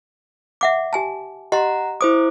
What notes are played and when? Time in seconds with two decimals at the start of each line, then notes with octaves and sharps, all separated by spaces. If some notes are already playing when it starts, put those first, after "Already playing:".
0.61 E5 F#5 D6
0.93 G4 G#5 A5
1.52 G4 D#5 F#5 A#5 C6
2.01 E4 C5 D6 D#6